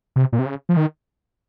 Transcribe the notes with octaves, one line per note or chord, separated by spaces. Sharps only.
C3
A#2
C3
C#3
F3
D#3